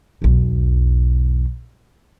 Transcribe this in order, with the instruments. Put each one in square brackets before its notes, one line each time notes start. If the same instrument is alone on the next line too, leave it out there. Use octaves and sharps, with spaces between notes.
[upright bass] B1 E2